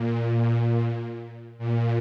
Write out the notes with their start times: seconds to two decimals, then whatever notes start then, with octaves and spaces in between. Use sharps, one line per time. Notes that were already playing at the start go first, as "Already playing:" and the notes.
Already playing: A#2
1.58 A#2